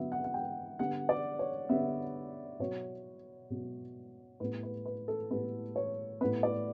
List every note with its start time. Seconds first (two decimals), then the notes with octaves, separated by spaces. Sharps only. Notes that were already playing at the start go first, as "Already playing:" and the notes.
Already playing: D3 F#3 B3 E5
0.12 F#5
0.24 F#5
0.34 G5
0.79 D3 G3 B3 F#5
1.09 D5
1.39 C#5
1.69 D3 G3 B3 E5
2.59 B2 F#3 B3 C#5
3.50 B2 F#3 B3
4.40 A2 G3 B3 B4
4.63 B4
4.86 B4
5.08 A4
5.30 A2 G3 B3 B4
5.76 C#5
6.21 A2 G3 B3 B4
6.43 D5